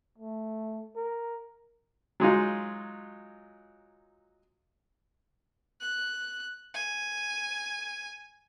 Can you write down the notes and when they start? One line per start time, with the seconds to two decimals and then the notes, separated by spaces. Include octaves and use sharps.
0.18 A3
0.96 A#4
2.20 F#3 G#3 D#4 F4
5.80 F#6
6.74 G#5